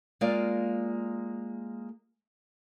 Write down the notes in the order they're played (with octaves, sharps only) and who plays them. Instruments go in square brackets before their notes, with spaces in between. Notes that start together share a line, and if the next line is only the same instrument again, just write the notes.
[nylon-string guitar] G#3 A#3 F4 D5